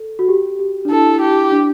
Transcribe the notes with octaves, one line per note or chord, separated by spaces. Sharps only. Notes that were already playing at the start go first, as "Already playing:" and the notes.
Already playing: A4
F#4
G4
G4
D4
E4 A4
G4
D4